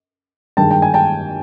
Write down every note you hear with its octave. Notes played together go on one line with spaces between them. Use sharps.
G2 D#3 G#3 G5 A5
G5
G#5
G5 A5